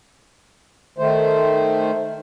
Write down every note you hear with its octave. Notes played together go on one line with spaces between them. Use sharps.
D#3 A3 C5